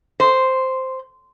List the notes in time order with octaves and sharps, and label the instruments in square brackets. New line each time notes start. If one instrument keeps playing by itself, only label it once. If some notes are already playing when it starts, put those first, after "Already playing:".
[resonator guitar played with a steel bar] C5